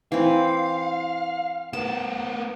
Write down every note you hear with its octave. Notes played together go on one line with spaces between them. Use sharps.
E3 C4 F5
B3 A#4 A5